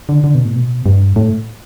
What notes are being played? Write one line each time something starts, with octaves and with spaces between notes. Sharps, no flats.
D3
D3
B2
A2
B2
G2
A2